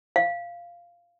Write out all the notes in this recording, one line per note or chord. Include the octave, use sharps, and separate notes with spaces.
F5